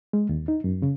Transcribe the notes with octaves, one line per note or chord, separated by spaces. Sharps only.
G#3
D#2
D#4
F#2
C#3